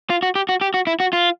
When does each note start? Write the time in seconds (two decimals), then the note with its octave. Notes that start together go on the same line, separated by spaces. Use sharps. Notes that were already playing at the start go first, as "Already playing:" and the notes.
0.10 F4
0.23 F#4
0.35 G4
0.49 F#4
0.61 G4
0.74 F#4
0.87 E4
1.00 F#4
1.13 F4